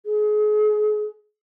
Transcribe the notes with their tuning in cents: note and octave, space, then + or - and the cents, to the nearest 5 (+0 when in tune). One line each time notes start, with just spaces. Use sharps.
G#4 +35